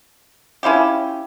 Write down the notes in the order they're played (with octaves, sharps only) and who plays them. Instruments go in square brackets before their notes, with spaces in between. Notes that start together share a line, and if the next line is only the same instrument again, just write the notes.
[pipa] C#4 E4 F4 G4